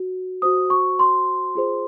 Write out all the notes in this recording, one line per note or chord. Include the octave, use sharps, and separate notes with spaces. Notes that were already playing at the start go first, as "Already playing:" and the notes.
Already playing: F#4
F#4 C5 D#6
C#6
C6
F4 G#4 C5